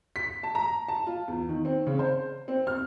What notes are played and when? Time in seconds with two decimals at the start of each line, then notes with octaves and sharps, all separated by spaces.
0.16 B6
0.43 A5
0.55 A#5
0.88 A5
1.07 F4
1.28 E2
1.49 D#3
1.65 C4
1.87 C#3
1.99 C5
2.48 C4
2.67 F6